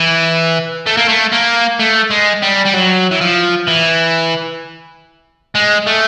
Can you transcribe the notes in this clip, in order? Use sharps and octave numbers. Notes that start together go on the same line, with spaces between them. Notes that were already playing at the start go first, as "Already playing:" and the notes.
Already playing: E3
A3
A#3
A3
A#3
A3
G#3
G3
G3
F#3
E3
F3
E3
G#3
A3